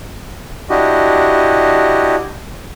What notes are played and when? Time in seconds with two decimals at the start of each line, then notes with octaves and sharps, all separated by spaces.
0.70 D4 E4 F#4 G4 D#5